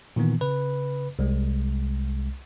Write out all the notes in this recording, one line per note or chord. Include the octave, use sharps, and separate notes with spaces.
A#2 D#3 E3 B3
C#3 B4
C2 G#3